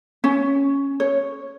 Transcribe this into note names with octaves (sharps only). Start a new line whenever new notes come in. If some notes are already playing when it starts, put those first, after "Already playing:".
C#4
C#5